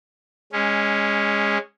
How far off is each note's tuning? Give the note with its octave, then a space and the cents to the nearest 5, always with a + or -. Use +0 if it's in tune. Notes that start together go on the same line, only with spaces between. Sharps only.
G#3 -15 C#4 +0